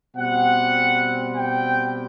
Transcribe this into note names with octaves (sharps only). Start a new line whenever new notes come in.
B2 G3 C4 F#5
G5